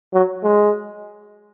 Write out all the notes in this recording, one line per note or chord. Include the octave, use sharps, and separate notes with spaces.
F#3
G#3